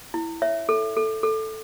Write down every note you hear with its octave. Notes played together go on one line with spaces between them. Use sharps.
E4
C#5 E5
A4
A4
A4